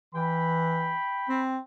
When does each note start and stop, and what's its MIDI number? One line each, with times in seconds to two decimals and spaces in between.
0.14 0.94 52
0.14 1.42 79
0.14 1.42 83
1.29 1.59 60